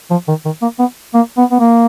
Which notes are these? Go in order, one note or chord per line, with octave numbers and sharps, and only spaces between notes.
F3
D#3
D#3
A#3
B3
A#3
B3
B3
A#3